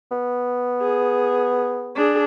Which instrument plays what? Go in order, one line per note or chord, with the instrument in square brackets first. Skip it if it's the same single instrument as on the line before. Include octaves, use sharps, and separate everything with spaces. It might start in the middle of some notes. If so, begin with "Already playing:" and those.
[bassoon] B3
[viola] G#4
D4 G#4